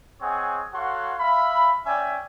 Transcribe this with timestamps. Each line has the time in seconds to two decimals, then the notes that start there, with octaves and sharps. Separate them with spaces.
0.21 C4 G#4 C#5 D#5 F#5 G#5
0.74 F#4 A4 C#5 F5 F#5 C6
1.20 E5 F5 B5
1.86 C#4 D5 E5 G5 G#5